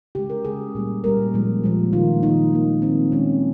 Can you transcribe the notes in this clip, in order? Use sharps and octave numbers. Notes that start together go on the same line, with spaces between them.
C#3 G#3 G4
A#4
C#3 G#3 G#4
A#2 G3 A#3
A#2 G3 A#3 A#4
A#2 F3 G#3
A#2 F3 G#3
D#3 A#3 F4
D#3 A#3 D#4
D#3 A#3
D#3 A#3 C4
D#3 G#3 C#4